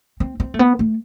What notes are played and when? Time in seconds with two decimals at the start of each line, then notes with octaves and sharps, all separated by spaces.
0.20 C4
0.40 C4
0.54 A3
0.59 B3
0.79 A3